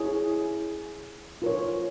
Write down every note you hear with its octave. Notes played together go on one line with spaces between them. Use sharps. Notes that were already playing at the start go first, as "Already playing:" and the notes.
Already playing: E4 G#4 C#5
F4 A#4 C#5